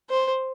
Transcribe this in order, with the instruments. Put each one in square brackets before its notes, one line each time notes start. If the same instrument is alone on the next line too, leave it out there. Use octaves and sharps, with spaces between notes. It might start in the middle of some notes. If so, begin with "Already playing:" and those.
[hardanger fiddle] C5